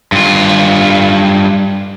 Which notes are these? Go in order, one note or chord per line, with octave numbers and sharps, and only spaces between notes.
G2 F4